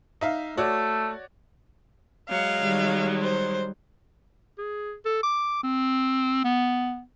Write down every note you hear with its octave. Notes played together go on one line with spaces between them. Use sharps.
D#4 E5 F5
A3 F#4 C#5 D5
F#3 G#3 F5
D#3 G3
C5
G#4
A4
D6
C4
B3